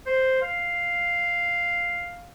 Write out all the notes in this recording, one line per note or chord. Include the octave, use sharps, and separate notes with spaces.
C5
F5